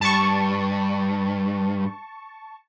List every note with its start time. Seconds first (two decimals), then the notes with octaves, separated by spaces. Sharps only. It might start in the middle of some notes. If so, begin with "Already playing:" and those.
0.01 G2 A5 C#6